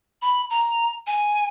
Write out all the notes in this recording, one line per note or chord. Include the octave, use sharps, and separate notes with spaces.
B5
A#5
G#5